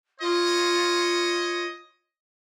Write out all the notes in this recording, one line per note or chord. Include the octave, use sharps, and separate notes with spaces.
F4 C#5 D#5